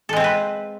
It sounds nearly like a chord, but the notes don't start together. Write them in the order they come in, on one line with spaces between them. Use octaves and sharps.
A4 G#3 C4 F4 B4